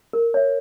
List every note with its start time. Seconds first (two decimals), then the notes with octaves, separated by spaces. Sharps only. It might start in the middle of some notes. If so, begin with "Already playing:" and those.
0.13 A#4
0.34 C#5 E5